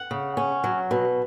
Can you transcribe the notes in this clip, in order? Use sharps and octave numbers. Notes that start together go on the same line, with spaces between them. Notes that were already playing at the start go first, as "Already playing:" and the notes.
Already playing: F#5
C#3
C#4
F#3
B2